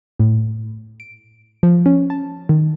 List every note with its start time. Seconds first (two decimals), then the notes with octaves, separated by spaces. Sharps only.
0.19 A2
1.00 D7
1.63 F3
1.86 C#4
2.10 A5
2.49 D#3